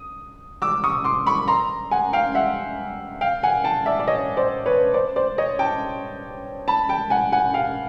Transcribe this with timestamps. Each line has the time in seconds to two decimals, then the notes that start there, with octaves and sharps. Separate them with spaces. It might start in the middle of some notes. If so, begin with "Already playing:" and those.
Already playing: D#6
0.62 D6 E6
0.84 C#6 D#6
1.04 C6 D6
1.27 B5 C#6
1.48 A#5 C6
1.91 F#5 G#5
2.13 F5 G5
2.35 E5 F#5
3.21 F5 G5
3.43 F#5 G#5
3.64 G5 A5
3.86 D5 E5
4.00 D5
4.08 C#5 D#5
4.37 C5 D5
4.66 B4 C#5
4.94 C5 D5
5.16 C5 D5
5.38 C#5 D#5
5.59 G5 A5
6.68 A5 B5
6.89 G5 A5
7.10 F#5 G#5
7.32 F#5 G#5
7.54 F5 G5